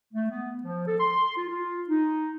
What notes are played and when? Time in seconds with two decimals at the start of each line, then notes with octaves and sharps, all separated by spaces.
0.13 A3
0.30 B3
0.63 F3
0.87 A4
1.00 C6
1.37 F4
1.49 F4
1.88 D#4